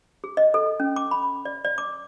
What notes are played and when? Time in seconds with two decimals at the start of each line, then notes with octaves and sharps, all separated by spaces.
0.24 G#4
0.37 D#5
0.54 A4
0.80 C#4
0.96 D6
1.11 B5
1.45 D5
1.64 D5
1.78 D6